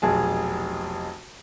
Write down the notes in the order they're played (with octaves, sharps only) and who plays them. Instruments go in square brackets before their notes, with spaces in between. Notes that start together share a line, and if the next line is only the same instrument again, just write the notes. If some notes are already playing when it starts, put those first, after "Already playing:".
[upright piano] F1 B1 G#4 A5